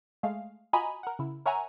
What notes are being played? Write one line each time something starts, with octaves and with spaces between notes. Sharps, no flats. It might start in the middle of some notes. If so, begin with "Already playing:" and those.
G#3 A3 G#4 F5
F4 F#4 D#5 G#5 A#5 B5
A#4 F#5
C#3 E4
A#4 C#5 E5 F#5 G#5 A#5